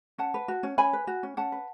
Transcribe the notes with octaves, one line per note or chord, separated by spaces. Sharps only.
C#4 F#5 A5
B4
F#4
C#4
C#4 G#5 B5
B4
F#4
C#4
C#4 F#5 A5
B4